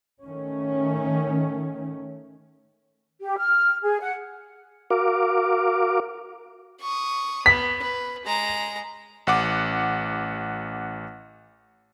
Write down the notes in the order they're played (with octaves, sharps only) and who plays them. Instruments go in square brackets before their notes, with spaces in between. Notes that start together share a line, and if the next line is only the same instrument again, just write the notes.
[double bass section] D#3 A3 C#4
[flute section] G4
F6
G#4
F#5
[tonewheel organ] F#4 A#4 F5 D6
[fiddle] C#6 D#6
[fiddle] B3 [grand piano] B6
[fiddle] B4
G#3 A#5
[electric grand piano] A1 F#5 D6